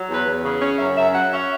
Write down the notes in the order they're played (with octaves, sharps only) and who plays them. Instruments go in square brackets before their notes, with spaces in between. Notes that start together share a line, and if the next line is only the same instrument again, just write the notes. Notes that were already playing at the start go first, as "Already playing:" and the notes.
Already playing: [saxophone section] F#3
E2
B4
E2
C#3
C#4 C#5
F#2 E5
F#2 E5
F#3 F#5
C#4 E5